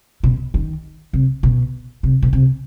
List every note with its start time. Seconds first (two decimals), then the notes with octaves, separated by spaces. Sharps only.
0.23 B2
0.54 D#3
1.13 C3
1.43 B2
2.03 C3
2.22 B2
2.33 C3